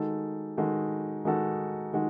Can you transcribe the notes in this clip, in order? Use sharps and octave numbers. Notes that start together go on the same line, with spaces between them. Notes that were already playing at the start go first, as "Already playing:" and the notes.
Already playing: D#3 G#3 D#4 F#4 A4
D#3 G#3 D#4 F#4 A4
D#3 G#3 D#4 F#4 A4
D#3 G#3 D#4 F#4